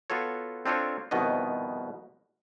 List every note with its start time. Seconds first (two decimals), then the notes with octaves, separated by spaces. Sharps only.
0.10 B3 F4 F#4 A4 C#5
0.66 C4 D4 F4 A4 C#5
1.11 C2 F2 B2 D#3 B3 D#5